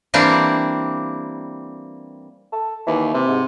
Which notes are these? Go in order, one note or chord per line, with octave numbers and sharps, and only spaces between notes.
E3 G3 A#3 C4 D4
A4
D#2 E3
C3 E3
G#2